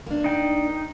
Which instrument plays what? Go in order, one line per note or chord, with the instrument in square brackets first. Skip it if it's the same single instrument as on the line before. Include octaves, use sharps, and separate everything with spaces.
[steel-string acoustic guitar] A#3 D4
[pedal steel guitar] D#4 G5